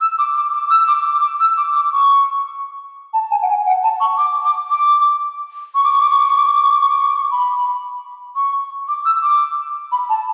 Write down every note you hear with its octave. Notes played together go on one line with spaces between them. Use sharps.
E6
D6
D6
D6
E6
D6
D6
D6
E6
D6
D6
C#6
A5
G#5
F#5
G#5
F#5
A5
C#6
D6
D6
D6
C#6
D6
C#6
D6
C#6
D6
C#6
D6
C#6
D6
C#6
D6
C#6
D6
C#6
D6
C#6
B5
C#6
D6
E6
D6
B5
A5